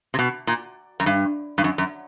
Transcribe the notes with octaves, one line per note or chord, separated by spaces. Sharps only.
C3
B2
A#2
F#2
G2
G2
F#2
F#2